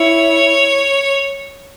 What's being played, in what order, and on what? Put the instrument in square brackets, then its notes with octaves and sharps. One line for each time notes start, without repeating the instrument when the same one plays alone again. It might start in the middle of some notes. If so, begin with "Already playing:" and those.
Already playing: [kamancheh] E4 [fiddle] C#5